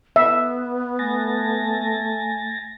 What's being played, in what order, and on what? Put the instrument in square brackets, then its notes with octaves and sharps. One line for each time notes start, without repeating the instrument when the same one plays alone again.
[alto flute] B3 [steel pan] E5
[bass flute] A3 [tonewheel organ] G#5 A6 A#6